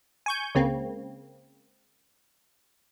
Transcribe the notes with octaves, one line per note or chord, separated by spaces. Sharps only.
G#5 C#6 G6
C#2 C#3 A#3 C4